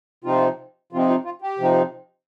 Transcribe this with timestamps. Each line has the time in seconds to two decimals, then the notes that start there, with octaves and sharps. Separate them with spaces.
0.24 C3 F3 C4 D#4 F4
0.93 C3 F3 C4 D#4 F4
1.09 F4
1.25 F4
1.42 G4
1.58 C3 F3 C4 D#4